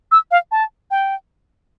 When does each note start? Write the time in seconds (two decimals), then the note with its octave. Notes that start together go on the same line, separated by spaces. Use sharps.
0.12 E6
0.31 F5
0.52 A5
0.91 G5